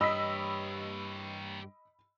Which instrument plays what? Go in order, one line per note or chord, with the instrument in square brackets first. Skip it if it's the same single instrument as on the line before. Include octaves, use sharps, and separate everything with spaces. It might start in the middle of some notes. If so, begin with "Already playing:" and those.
[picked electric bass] G2 [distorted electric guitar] G4 C#5 [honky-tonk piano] D#5 E6 [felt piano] B5 B6